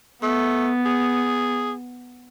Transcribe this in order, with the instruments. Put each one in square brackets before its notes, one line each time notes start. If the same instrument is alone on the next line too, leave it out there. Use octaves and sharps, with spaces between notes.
[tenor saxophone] A3 [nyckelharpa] B3
[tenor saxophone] G#4